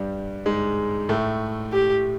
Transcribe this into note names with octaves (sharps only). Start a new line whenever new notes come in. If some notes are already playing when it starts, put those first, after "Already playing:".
Already playing: G2 G3
G#2 G#3
A2 A3
G4